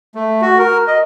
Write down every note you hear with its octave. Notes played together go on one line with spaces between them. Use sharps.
A3
F#4
A#4
D#5